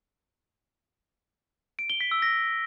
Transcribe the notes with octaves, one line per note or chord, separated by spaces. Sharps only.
D7
G7
B6
E6
A#6